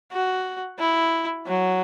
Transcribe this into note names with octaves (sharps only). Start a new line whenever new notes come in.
F#4
E4
F#3